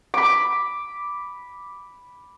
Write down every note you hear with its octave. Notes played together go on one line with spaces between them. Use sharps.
B5 D6